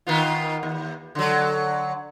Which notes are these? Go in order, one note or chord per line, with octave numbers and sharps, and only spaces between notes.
D#3 B3 F4
D#2
D3 F#3